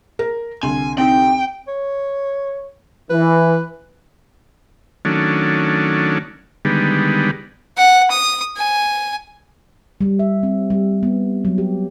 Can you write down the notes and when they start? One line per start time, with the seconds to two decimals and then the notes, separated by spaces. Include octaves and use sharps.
0.19 A#4
0.63 C2 D3 G#5 C6
0.98 C4 D#4 G4 G5
1.68 C#5
3.10 E3 B4
5.05 D#3 F#3 A3 C#4 D4
6.65 D3 D#3 G3 G#3 B3
7.77 F#5
8.11 D#6
8.57 G#5
10.01 G3
10.19 E5
10.43 C4
10.70 G3
11.03 B3
11.45 F#3
11.58 G4